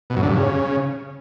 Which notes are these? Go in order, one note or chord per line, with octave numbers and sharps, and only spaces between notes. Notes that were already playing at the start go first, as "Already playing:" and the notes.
B2
F#2
D3
G2
C#3